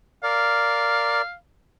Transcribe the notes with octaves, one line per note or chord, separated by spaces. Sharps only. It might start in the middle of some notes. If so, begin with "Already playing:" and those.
A#4 D5 F5